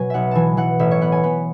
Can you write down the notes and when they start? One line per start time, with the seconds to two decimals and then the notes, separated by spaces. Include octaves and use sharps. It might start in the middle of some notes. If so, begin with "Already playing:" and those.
Already playing: B2 F#3 G#5
0.10 B1 E5 F#5
0.31 E3 G#5 A5
0.57 E3 F#5
0.79 A1 E5
0.91 C#5
1.01 B3 F#5
1.12 G#5
1.23 B3 B5